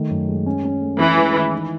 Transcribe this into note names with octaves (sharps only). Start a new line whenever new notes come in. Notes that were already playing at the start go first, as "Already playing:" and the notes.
Already playing: D#3 A3
F#2
G#3
C#4
C#4
A3
E3 C#4
G#3
D#3
D#4